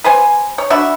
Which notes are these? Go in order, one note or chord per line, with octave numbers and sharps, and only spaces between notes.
B4 C5 G#5
C#5
D4 F#4 E5 B5